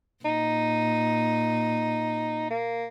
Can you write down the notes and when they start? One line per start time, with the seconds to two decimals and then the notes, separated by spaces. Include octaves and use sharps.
0.25 A#2 D#4
2.50 A#3